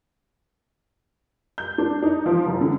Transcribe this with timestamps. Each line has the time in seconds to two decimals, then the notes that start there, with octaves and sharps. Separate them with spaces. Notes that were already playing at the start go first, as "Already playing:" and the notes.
1.58 G6
1.78 D4
2.03 D#4
2.26 F3
2.47 F#1
2.61 D3